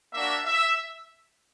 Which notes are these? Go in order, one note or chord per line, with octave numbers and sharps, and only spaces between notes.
A#3 D4 F#4 E5
E5